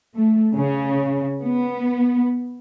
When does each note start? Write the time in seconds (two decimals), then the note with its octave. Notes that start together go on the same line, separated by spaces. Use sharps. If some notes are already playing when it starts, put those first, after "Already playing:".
0.15 A3
0.54 C#3
1.42 B3